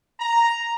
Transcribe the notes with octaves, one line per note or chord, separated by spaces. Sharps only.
A#5